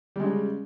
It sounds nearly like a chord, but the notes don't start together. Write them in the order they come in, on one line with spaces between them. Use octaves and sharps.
G3 G#3 C#3